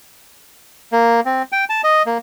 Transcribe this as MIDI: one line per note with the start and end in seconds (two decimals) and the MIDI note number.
0.92 1.20 58
1.25 1.43 60
1.52 1.65 79
1.70 1.81 81
1.84 2.02 75
2.06 2.18 58